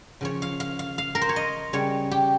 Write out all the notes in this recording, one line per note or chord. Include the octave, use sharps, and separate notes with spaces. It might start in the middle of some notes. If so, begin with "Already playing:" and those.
C#3 F3 C#5
F5
F5
F5
F5
A#4
C5
C#5
D#5
C#3 G3 C#5
G4